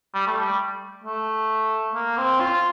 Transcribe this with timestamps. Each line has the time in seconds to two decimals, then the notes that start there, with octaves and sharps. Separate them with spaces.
0.14 G3
0.27 A3
0.40 G3
1.04 A3
1.95 A#3
2.18 C4
2.40 F4